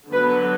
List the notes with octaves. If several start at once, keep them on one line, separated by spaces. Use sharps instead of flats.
D3 F#3 B3 B4